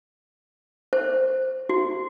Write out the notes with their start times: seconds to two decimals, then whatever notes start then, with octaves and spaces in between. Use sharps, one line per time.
0.93 C5
1.69 F#4